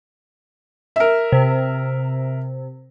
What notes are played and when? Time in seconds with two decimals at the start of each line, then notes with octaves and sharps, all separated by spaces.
0.96 A#4 E5
1.32 C3